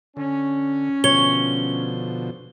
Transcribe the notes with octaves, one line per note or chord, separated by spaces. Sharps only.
D3 C#4
B2 D3 F3 C#5 G7